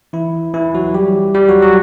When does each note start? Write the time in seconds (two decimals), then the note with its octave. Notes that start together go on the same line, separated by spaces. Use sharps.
0.13 E3 E4
0.54 E3 E4
0.75 F#3 F#4
0.94 G3 G4
1.34 G3 G4
1.48 F#3 F#4
1.62 F#3 F#4